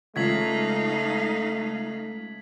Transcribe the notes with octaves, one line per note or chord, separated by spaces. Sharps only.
C#2 A3 D#4 F4 F5 G#6 B6 F#7